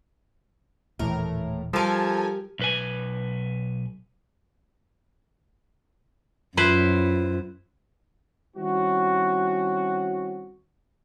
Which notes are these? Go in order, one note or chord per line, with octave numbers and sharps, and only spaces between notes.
D#1 A2 E3 A#4
F3 G3 G4 A4 A#4 G#5
B1 B4 G#5
F#2 E4 F4 B4 C5
D#3 G3 C4 C#4 E4 F#4